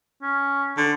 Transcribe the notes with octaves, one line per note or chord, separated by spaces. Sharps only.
C#4
D3